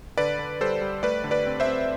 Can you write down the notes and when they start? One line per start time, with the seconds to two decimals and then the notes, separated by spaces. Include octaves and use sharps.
0.18 D3 B4 D5
0.39 D3
0.61 G3 A4 C5
0.81 G3
1.03 A3 B4 D5
1.24 D3
1.31 B4 D5
1.46 C4
1.60 C5 E5
1.67 C4